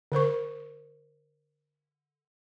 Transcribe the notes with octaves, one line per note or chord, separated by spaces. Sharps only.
D3 A#4 C5 C#6